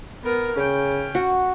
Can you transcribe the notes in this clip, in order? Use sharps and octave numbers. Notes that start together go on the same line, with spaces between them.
B3 A#4
C#3 C#4 G5
F#4